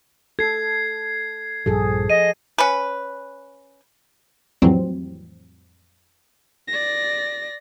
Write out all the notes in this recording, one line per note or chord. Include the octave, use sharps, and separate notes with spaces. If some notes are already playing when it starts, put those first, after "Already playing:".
A4 G#6 C7
A#1 G2 F3 G3 G#4 A4
D#5 D#7
C#4 B4
F2 A2 E3 F#3 G3 C4
D5 A#6